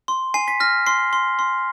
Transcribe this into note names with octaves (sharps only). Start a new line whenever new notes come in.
C6
G#5 C7
B6
F6 A#6
C6 C7
C6
C6